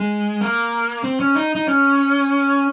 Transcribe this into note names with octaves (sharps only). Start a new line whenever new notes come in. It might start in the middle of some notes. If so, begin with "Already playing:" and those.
Already playing: G#3
A#3
C4
C#4
D#4
D#4
C#4